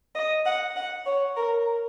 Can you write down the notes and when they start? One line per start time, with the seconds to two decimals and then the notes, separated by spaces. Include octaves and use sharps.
0.15 D#5
0.45 F#5
0.76 F#5
1.06 C#5
1.36 A#4